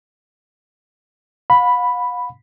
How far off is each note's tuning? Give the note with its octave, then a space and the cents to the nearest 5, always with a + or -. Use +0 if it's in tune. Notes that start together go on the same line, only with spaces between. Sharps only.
F5 +45 B5 +0